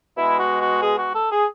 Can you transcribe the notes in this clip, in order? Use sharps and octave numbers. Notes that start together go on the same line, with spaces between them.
B2 G#3 E4
F#4
F#4
G#4
F#4
A4
G#4